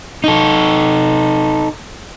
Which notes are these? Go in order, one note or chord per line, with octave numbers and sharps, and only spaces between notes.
D#4 A4